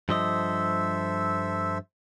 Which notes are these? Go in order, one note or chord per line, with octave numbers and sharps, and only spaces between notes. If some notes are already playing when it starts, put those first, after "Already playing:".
G2 F3 A4 C5 D#5 E5